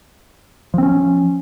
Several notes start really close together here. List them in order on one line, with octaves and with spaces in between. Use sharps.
F3 C4 C#4